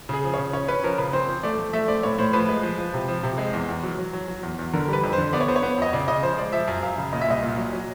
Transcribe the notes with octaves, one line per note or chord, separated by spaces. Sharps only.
C#3 G#4
F3
C#3 C#5
C#4 C#5
C#4 B4
F3 A#4
C#3 B4
C4 C5
F3 C5
A3 D5
A3
A3 E5
C4 D5
A2 C#5
A2 C5
F3 B4
G#3
F3
F3
C3
F3
C3
G#3
E2
E2
F#3
F#3
F#3
F#3
E2
E2
D3 A#4
G3
B4
F2
C5
D3
B3 D5
C#5
B3 C5
C#5
B3
F2 D#5
C#3 D5
C#3 D#5
F3 C5
G#3 D5
F3 E5
F#2
F#2 F5
C#3
A#2 D#5
E5
C2 D#5
A#2
F#3
F#3